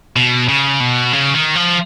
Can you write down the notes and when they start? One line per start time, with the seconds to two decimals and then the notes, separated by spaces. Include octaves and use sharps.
0.16 B2
0.49 C#3
0.80 B2
1.13 C#3
1.34 D#3
1.55 F3